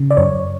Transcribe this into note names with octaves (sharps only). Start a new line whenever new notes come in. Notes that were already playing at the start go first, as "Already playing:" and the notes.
Already playing: C#3
D5
F#2 C#5